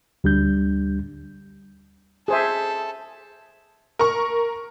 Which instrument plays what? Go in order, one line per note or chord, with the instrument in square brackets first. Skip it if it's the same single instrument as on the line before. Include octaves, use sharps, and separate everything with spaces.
[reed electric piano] D2 G3 D4 G6
[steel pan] G#4 C5 E5 [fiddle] A4
[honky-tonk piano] A#4 C#6